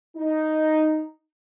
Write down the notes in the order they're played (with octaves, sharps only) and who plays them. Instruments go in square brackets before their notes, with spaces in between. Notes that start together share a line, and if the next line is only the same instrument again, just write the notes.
[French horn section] D#4